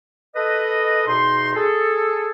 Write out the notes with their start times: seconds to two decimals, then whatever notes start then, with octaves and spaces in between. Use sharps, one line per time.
0.36 A4 B4 D#5
1.07 E2 B2 D#4 C6
1.55 G#4 A4